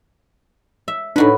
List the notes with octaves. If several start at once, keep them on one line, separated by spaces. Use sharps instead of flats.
E5
A2 D4 D#4 F#4 B4